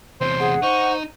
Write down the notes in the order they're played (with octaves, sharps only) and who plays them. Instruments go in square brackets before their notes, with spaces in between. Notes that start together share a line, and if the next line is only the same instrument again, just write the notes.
[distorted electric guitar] E2 C3 [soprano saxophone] C5
[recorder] G#4 [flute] F#5
[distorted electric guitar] D#4 [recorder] C5 [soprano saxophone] C#6